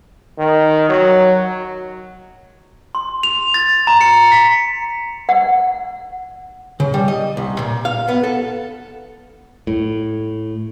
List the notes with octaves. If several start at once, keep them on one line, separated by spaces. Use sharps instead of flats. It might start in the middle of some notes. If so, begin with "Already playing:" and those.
D#3
F#3
C6
F7
A6
A#5
C#7
B6
F#5
C#3
G3
D#5
C2
A#2
F5
B3
A4
A2